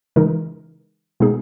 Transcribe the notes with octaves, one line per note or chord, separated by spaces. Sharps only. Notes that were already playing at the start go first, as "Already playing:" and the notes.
C#3 E3 G#3 D#4 A#4
B2 G#3 B3 D#4 G#4